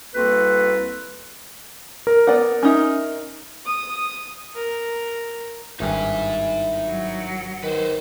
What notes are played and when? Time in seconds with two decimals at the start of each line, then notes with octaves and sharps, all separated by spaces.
0.15 C2 A#3 C4 F#4 A4 B4
2.07 A#4
2.27 B3 D5 F#5
2.63 C#4 D#4 E5
3.65 D#6
4.55 A#4
5.80 G#1 G2 D#4 E4 G#5
6.86 F#3
7.63 D#3 B4 C5